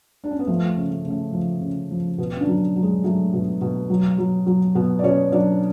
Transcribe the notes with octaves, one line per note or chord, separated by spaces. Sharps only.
D4
C#4
B3
F3 A3
C#3
A3
C#3
A3
F3
C#3
F3
B2 B3
C#4
D3 D4
F#3
F#3
G#3 G#4
F#3 A3 A4
B2
B2
F#3
F#3
F#3
B2 B3 B4
D5
B2 C#4 C#5
F#3 D4 D5